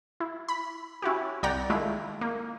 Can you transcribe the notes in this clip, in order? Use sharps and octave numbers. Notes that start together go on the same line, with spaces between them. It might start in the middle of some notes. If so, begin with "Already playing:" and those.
E4
B5
C#4 E4 F#4 G4
C2 D5 F#5 G5 A#5 A#6
D#3 G#3 A3 E4 F4
A#3